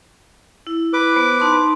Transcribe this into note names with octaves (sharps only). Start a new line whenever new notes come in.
E4
B4 D6
B3 C5
D#4 A5 C6